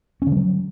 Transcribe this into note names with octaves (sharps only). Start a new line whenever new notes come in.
C#4
D3
G3
F#3